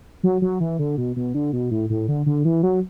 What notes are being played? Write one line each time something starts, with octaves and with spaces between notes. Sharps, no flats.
F#3
F#3
E3
D3
B2
B2
D3
B2
A2
A2
D3
D3
E3
F#3